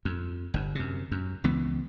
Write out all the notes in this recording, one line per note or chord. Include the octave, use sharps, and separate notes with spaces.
F2
G1 G2
F#2 C3
F#2
C#2 E3 B3